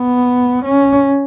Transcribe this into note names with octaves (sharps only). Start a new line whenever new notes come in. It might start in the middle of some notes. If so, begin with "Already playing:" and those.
Already playing: B3
C#4